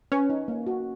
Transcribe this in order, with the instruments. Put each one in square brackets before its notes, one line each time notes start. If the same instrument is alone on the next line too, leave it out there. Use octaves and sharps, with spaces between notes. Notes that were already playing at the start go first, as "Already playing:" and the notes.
[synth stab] C#4 [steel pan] B4
[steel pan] D#4
A#3
F#4